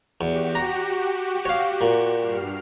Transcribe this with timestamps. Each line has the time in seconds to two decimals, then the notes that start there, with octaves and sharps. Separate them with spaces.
0.21 E2 F#4 G4
0.55 A#5
1.45 C#5 F5
1.81 A#2
2.19 G2 F6 C7